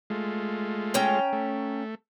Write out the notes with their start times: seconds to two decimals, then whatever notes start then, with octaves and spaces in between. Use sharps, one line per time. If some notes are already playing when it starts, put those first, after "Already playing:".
0.10 G#3 A3 F4
0.94 C#4 G5 A#5
1.33 A3